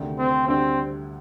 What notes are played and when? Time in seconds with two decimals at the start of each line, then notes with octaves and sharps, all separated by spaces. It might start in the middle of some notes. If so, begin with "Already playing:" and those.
Already playing: D2 C3 D#3 A3 D4
0.18 C4
0.48 D2 D3 G3 C4 D4